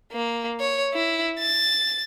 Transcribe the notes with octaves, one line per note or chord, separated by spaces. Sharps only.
A#3
C#5
E4
A6